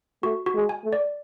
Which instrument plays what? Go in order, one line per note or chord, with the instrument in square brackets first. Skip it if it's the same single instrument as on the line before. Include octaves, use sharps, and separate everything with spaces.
[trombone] A3 [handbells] F#4
[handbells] F#4
[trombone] G#3
[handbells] G#5
[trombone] A3
[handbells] D5